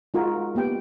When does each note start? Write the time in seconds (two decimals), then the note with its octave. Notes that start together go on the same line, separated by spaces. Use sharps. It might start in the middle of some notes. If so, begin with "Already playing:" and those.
0.14 G#3 D#4 F4 F#4 A#4 D#5
0.55 A#3 B3 G4 G5